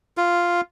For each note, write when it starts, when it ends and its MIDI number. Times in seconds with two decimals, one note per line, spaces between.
0.17 0.61 65